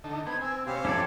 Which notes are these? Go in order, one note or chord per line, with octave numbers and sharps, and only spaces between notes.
D3 D#4 A4
B3 C4 G5 G#6
C4 G#5 E6
B2 C4 C#4 G4 C5 F5
F2 C#4 E4 A4 D5 D6 G#6